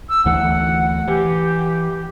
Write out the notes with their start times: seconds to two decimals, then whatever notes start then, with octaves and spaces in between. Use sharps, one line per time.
0.09 E6
0.25 D2 E3 A3 F#5
1.07 E3 G4